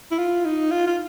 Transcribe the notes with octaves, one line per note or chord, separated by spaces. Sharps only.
E4
F4
D#4
F4
F4